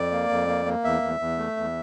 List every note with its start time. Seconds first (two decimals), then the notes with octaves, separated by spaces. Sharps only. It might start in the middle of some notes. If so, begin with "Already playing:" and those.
Already playing: F2 D5
0.12 A#3
0.29 F2
0.48 A#3
0.66 A#3
0.84 E2 E5
1.02 E2
1.20 E2
1.38 A3
1.57 E2